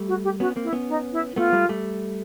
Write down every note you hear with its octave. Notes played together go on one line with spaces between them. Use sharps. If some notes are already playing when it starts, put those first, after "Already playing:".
Already playing: G3 A3
F#4
G4
B3 C#4 F#4
A#3 C4
E4
B3 C#4
D#4
E4
E4
A3 B3 F4
G3 A3
G3 A3